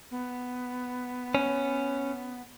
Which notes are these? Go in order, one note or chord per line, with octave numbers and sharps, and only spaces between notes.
B3
C#4